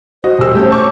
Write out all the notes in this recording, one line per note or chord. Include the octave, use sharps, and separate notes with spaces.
F#4 C5 D#5
E1 G3 E6
A3 C#4 G4 G6
A5 C#6 D6